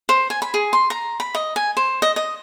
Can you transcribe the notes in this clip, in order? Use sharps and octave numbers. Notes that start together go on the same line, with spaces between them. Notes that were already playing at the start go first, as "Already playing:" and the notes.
C5
G#5
B5
G#4
C6
A#5
B5
D#5
G#5
C5
D#5
D#5